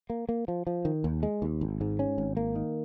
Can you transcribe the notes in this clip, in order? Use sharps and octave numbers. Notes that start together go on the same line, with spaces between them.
A#3
A#3
F3
F3
D#3
D#2
G#3
D#2
G#1
G#2
C#4
G#1
A#3
D#3